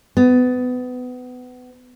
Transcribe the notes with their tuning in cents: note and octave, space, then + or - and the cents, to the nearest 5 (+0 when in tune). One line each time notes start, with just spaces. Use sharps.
B3 +25